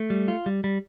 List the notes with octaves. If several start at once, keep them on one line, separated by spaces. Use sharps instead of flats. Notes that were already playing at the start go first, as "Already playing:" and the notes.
Already playing: A3
G3
F4
G3
G3